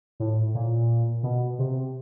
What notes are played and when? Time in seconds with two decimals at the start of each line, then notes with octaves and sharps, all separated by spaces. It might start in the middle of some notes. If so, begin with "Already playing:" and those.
0.20 A2
0.55 A#2
1.23 B2
1.59 C3